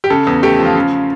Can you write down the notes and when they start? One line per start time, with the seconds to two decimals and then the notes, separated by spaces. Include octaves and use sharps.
0.04 G4
0.10 C#3 A4
0.27 E2
0.43 A3 G4
0.59 F3
0.65 F4
0.76 C#3